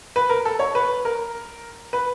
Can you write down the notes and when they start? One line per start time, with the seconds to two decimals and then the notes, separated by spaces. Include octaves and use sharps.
0.16 B4
0.30 A#4
0.45 A4
0.59 C#5
0.75 B4
1.05 A#4
1.93 B4